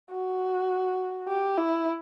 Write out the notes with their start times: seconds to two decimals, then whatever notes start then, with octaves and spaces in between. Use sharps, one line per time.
0.11 F#4
1.29 G4
1.58 E4